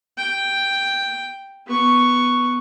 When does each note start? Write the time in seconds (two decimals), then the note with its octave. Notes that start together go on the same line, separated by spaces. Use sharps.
0.17 G5
1.66 B3 C#6